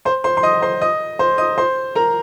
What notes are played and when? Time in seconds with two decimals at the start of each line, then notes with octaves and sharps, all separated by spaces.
0.05 C5 C6
0.24 C5 C6
0.37 C6
0.43 D#5 D#6
0.62 C5 C6
0.81 D#5 D#6
1.19 C5 C6
1.38 D#5 D#6
1.58 C5 C6
1.95 A#4 A#5